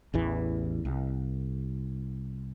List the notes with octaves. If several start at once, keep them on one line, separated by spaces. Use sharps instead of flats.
A1 E2 E3
C2